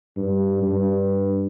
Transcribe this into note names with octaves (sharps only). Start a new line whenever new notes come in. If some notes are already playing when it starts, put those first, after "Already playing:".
G2
G2